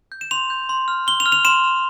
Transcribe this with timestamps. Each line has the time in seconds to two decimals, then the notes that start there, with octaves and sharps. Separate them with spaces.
0.12 G6
0.21 E7
0.31 C6 F7
0.50 G6
0.69 C6
0.88 F6
1.07 C6 G7
1.20 F7
1.26 F6
1.32 F7
1.45 C6 E7
1.64 F6